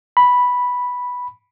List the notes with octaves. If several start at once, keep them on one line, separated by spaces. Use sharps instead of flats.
B5